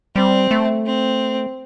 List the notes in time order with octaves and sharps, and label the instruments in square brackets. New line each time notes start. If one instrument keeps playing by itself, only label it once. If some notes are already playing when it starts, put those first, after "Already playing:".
[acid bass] G3 [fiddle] C4
[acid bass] A3
[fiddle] C4